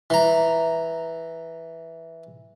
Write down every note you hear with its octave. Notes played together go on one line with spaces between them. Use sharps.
E3 A#5